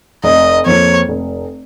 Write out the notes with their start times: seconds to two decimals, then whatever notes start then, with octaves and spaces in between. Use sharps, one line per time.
0.24 F1 D#5
0.66 F2 F3 A#3 C#5
1.09 F1